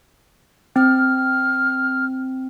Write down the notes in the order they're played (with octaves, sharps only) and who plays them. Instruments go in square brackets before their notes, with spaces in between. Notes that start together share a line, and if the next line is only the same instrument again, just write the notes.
[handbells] C4 [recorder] F6